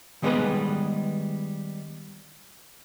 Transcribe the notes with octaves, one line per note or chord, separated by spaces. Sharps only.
D#3 G3 G#3 B3 G#4 B4